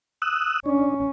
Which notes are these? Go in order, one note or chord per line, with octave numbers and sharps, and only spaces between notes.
D#6 E6 F#6
C#4 D4